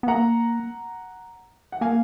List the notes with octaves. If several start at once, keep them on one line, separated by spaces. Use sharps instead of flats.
B3
A#3 F#5 A#5
F#5
A#3 F5 G#5